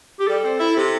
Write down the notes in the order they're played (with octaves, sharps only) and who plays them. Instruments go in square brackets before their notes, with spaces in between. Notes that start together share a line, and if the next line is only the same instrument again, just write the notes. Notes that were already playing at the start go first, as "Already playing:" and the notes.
[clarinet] G4
[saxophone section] G3 [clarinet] A4
[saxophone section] C4
E4
C3